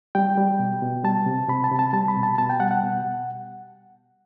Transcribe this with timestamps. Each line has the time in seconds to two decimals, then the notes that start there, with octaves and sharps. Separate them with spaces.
0.15 G3 G5
0.37 G3
0.59 B2
0.82 B2
1.04 G3 A5
1.26 C3
1.49 C3 B5
1.64 A5
1.71 C3
1.79 A5
1.93 G3 A5
2.08 B5
2.16 B2
2.23 A5
2.38 B2 A5
2.49 G5
2.60 G3 F#5
2.71 F#5
2.83 B2